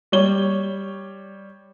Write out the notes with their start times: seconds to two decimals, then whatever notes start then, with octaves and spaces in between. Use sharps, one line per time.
0.12 G3 C#5 G7